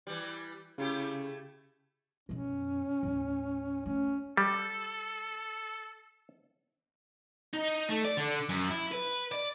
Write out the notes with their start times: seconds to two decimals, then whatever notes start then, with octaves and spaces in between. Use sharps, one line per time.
0.07 E3 G3
0.78 C#3 A3 E4 G4
2.29 F#2 B2 C#4
3.03 D#2 A2
3.86 A3 C#4
4.37 G3 A4
7.53 D#4
7.89 A3
8.05 D5
8.17 D3
8.49 F#2
8.70 E4
8.92 B4
9.32 D5